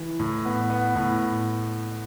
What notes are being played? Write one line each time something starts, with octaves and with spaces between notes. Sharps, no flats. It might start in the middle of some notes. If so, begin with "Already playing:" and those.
Already playing: E3
A2
B3
B3
A2